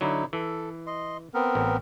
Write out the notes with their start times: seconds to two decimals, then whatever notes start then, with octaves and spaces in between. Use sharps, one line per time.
0.01 D3 F#3 D#4 E4
0.33 E3 A4
0.87 D#5 C6
1.34 B3 C4 A#4
1.55 A1